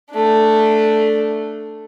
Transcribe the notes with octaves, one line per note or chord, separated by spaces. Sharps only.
A3 D4